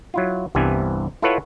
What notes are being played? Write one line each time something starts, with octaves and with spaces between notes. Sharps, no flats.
F#3 E4 F4
C2 G2 C3 E3 B3 G#5
E4 F4 A4 B4 C#5 F#5